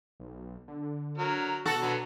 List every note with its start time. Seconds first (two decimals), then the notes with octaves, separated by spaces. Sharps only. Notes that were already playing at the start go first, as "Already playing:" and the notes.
0.20 B1
0.68 D3
1.18 F#3 A#4
1.66 B2 F#4 A4
1.81 D3 F#3 B3